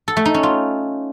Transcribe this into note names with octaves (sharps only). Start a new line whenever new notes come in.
A4
A3
D#4
C#4
F4